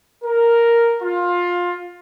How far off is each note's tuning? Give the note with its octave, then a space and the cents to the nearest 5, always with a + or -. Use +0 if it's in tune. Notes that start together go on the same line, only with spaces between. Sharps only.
A#4 +0
F4 +15